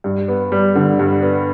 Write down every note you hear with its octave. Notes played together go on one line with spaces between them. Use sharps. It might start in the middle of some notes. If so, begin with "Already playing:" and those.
G2
B3
G3
D3
G2
B3